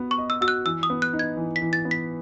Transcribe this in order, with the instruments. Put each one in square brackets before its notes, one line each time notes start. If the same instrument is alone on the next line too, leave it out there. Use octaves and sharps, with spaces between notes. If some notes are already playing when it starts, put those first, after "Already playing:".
Already playing: [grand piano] B3 F#4 B4
[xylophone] C#6
[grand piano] D#5
[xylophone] E6
[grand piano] F#4 [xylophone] E6
[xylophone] F#6
[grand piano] E3 [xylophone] E6
[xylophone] D#6
[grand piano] B3
[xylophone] F#6
[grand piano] D#4
[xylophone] G#6
[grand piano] E3
[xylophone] B6
[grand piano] E3
[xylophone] A6
[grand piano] B3
[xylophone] B6